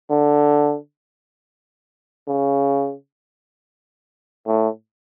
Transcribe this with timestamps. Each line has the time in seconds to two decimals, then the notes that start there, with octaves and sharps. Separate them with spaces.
0.10 D3
2.28 C#3
4.46 A2